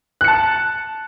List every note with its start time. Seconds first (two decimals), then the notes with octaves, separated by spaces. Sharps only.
0.21 F#6
0.24 C#7
0.28 A5